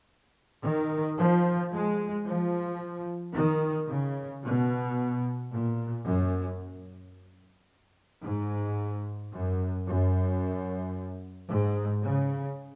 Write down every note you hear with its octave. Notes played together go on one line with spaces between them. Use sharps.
D#3
F3
G#3
F3
D#3
C#3
B2
A#2
F#2
G#2
F#2
F#2
G#2
C#3